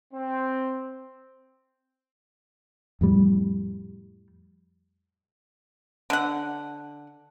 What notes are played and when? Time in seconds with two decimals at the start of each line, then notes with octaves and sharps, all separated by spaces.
0.14 C4
3.01 F2 A2 G3
6.10 D3 F#5